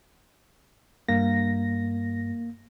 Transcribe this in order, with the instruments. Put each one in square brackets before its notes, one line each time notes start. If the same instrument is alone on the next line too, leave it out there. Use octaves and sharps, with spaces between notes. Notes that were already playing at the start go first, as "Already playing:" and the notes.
[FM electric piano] G2 A#6 [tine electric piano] A#3